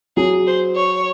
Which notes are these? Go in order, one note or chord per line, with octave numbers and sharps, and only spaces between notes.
F#3 G#4
C5
C#5